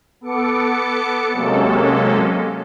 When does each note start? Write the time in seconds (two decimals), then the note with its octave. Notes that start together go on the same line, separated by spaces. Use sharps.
0.21 B3 A4 D6 C#7
1.31 C3 F#3 G#3 A#3 C#4 A4